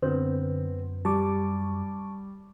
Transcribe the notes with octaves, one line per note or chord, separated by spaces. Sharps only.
F#2 D3 B3 C4
G3 A5 C#6 D6